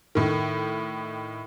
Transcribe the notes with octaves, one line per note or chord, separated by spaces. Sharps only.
A2 D#3